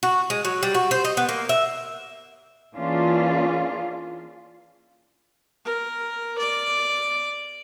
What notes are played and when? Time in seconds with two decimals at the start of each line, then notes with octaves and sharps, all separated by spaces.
0.03 F#4
0.30 G#3
0.45 F#3
0.63 G3
0.74 F#4
0.91 C5
1.05 D#5
1.17 B3
1.29 A#3
1.49 E5
2.75 E3 A#3 C#4 D4 F4 G#4
5.65 A#4
6.38 D5